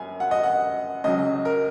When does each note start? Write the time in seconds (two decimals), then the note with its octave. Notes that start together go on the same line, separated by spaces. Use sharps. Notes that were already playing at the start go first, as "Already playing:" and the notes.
Already playing: F#1 F#2 G#5
0.20 F#5
0.31 D#5
0.43 F#5
1.04 C#2 C#3 F#3 D#5
1.45 A#4